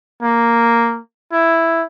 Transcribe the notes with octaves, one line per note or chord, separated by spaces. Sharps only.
A#3
E4